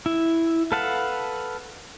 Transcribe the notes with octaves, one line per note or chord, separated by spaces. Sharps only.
E4
A4 B4 F5 F#5 A5